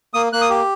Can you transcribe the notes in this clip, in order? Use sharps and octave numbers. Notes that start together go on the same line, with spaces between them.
A#3 D#6
A#3 F#6
D#6
G4